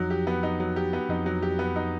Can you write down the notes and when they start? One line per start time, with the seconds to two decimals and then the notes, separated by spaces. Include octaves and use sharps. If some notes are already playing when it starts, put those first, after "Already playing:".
Already playing: F2 F3 F#3 D#4
0.10 G4
0.27 B3
0.43 D#4
0.60 F#3
0.76 G4
0.93 B3
1.09 F2 F3 D#4
1.26 F#3
1.42 G4
1.59 B3
1.76 D#4